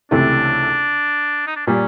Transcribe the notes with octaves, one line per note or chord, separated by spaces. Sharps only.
C#2 C3 E3 A3 D4
D#4
D4
A#2 G3 C#4